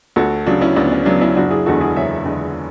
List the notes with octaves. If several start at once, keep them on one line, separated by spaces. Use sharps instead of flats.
D2 F#4 A4
C#3 F#3 D4 F#4
C#4 E4
D2 B3 D4
C#4
C#3 F#3 B3 D4
C#4 E4
F#1 D4 F#4
E4 G#4
E2 D3 G#3 F#4 A4
E4 G#4
F#1 C#5 E5
E2 D3 G#3